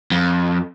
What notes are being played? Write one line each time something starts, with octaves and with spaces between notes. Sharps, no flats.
F2